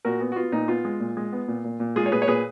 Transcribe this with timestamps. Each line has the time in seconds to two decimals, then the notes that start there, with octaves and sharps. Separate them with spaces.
0.05 A#2 F#4 A#4
0.21 B3
0.32 F#4
0.36 B3 F4
0.52 A#2 D#4
0.68 B3 F4
0.85 G#3
1.00 A#2
1.17 G#3
1.32 B3
1.48 A#2
1.64 A#2
1.80 A#2
1.96 G#3 F4 G#4
2.06 C#5
2.11 A#2 G#4 B4
2.22 C#5
2.28 A#2 G#4 B4